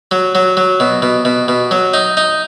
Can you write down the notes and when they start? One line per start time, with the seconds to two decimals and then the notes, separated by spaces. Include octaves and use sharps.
0.11 F#3
0.35 F#3
0.57 F#3
0.80 B2
1.02 B2
1.25 B2
1.48 B2
1.71 F#3
1.94 D#4
2.17 D#4